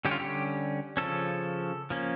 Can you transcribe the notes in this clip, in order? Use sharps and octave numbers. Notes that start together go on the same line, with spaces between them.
D3 G3 C#4 G4
F4
G4
C#3 F3 C#4 A4
F3 A#3 C#4